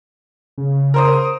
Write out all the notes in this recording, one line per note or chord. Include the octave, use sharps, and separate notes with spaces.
C#3
A#4 C5 D#6